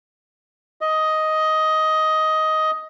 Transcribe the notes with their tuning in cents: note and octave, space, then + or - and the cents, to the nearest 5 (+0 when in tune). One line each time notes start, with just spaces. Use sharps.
D#5 +10